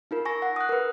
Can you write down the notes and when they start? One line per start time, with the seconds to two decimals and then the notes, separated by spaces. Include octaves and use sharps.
0.11 D#4 F4 A#4
0.25 G#5 C#6 A#6
0.42 F#5
0.56 D#6 F#6
0.69 A#4 B4